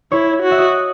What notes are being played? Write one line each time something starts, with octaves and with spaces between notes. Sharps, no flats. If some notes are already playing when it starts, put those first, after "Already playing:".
E4 C#5
F#4
E5
D#5